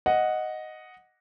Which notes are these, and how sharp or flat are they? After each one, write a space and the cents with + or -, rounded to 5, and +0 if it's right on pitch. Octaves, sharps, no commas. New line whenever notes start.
D#5 +0 F#5 -5